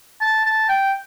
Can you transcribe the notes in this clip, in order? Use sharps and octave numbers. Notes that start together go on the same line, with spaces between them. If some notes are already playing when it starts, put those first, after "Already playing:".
A5
A5
G5